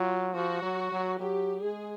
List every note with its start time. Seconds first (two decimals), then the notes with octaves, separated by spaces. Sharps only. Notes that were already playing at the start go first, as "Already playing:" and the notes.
Already playing: F#3 F4
0.34 F3 F#4
0.63 F#3
0.92 F#3
1.20 F#3 G4
1.63 G#3 G#4